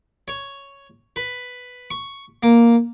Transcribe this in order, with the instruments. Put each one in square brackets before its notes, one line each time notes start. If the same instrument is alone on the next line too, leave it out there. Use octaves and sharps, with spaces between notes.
[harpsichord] C#5
B4
C#6
A#3